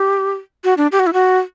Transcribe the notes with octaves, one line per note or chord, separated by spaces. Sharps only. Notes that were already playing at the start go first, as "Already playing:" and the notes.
Already playing: G4
F#4
D4
G4
F#4
E4
F#4